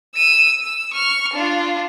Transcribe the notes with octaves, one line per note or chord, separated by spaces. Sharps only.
E6 D#7
E6
C#6 F6
D4 F4